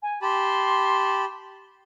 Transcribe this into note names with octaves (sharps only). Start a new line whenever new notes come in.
G#5
G4 A5 B5 C6